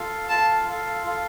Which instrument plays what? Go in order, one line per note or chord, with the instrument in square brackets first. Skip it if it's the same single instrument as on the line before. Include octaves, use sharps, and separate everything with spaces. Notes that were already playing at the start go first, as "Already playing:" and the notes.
Already playing: [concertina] F4 A4 F5
[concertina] F4 A4 F5 [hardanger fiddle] A5
[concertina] F4 A4 F5
F4 A4 F5